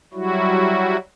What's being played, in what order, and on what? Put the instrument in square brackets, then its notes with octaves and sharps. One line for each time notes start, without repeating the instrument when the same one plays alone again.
[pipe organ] F#3 G3 E4 F#4